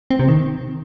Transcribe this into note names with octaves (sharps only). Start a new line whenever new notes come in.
C4
C3
D#3